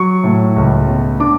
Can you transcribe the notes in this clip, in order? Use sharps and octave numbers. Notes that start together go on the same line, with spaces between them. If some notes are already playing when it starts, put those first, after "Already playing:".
Already playing: F#3 C#6
A2
C#2
B2
D4 D6